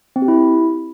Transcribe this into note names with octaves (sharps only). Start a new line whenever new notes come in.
C4
G4
E4